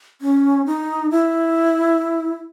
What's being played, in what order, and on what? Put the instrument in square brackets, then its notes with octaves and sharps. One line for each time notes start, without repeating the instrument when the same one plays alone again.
[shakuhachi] C#4
D#4
E4